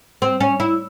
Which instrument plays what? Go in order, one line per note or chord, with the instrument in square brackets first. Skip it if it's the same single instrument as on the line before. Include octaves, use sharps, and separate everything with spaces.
[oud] C4
C#4
E4